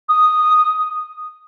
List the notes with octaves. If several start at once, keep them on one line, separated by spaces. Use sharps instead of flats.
D#6